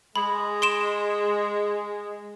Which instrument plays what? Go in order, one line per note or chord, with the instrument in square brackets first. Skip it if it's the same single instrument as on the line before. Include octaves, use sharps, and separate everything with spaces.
[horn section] G#3 [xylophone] B5
[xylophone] C6 D7 E7